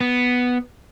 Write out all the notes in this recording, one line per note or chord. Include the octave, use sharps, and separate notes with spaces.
B3